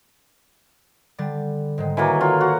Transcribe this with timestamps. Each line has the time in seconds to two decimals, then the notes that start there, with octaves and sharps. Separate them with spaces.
1.18 D3 G3 A6
1.78 G#2 D#3 G#3
1.97 E3 F#3 A#3 A4 G#5
2.21 F#3 F4
2.41 F#4